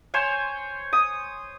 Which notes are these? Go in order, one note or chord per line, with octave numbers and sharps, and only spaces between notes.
C5 C#5 G#5
D#6